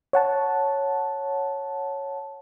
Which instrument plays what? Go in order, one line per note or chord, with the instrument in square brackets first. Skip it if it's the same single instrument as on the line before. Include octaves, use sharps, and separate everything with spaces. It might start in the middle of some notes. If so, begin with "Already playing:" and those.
[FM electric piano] C#5 F#5 A5